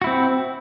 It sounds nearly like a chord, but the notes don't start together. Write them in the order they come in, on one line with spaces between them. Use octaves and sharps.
F#4 E4 C4